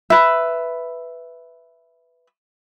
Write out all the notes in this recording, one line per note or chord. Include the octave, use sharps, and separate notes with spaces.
B4 E5